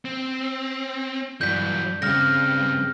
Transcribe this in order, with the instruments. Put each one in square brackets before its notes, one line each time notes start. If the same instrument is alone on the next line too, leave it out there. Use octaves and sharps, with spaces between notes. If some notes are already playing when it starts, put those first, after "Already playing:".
[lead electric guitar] C4
[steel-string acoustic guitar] G2 [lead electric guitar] E3 F#3 [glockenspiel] G6 B6
[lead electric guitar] E2 G2 [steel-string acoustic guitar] C#3 C4 [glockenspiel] F6 A#6